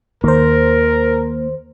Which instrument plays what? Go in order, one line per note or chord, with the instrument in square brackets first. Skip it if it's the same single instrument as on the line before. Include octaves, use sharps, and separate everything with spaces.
[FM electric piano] D#2 C5 [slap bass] A#3 [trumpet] A#4